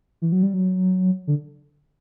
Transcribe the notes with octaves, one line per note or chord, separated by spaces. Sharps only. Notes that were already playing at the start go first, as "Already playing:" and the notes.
E3
F#3
G3
F#3
D3